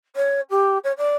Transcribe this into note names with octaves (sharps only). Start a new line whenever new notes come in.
C#5
G4
C#5
D5